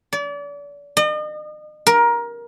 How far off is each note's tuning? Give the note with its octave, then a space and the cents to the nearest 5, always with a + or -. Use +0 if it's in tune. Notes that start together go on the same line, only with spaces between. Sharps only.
D5 -35
D#5 -40
A#4 +20